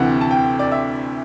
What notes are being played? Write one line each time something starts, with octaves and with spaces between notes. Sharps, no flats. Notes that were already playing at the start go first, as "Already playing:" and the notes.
Already playing: D2 C3 E3 F#5
A5
G5
D5
E5